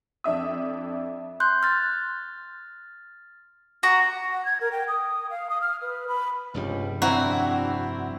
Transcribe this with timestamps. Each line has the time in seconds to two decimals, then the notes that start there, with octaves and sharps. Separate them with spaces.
0.24 F2 D4 E5 D#6
1.40 C6 F#6 G6
1.63 F6 A6
3.83 F#4 A#5
4.32 F#5
4.45 G#6
4.61 A#4
4.72 G5
4.88 D#6
5.30 F5
5.50 D#6
5.61 F6
5.82 B4
6.08 B5
6.54 F1 C#2 G2 G3
7.02 C4 D4 E4 F#4 A#5